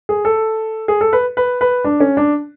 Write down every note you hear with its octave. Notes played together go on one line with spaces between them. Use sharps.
G#4
A4
G#4
A4
B4
B4
B4
D4
C#4
D4